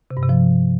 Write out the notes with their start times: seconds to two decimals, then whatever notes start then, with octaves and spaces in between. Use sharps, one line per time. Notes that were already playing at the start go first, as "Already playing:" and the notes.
0.11 C3
0.17 G2
0.23 C3
0.29 F3